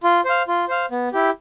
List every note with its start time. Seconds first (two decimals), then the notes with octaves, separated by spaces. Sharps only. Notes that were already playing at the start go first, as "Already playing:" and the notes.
0.03 F4
0.25 C5 F5
0.48 F4
0.68 C5 F5
0.91 B3
1.13 E4 G4